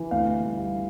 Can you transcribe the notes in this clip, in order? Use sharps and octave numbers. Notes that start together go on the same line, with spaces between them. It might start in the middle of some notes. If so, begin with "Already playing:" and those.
Already playing: E3
D2 F5
G3